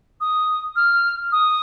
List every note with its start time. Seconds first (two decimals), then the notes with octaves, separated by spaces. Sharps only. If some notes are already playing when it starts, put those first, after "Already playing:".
0.21 D#6
0.76 F6
1.32 D#6